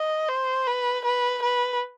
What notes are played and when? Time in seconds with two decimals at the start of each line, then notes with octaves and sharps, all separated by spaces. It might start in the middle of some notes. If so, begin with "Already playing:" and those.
Already playing: D#5
0.29 C5
0.67 B4
1.05 B4
1.43 B4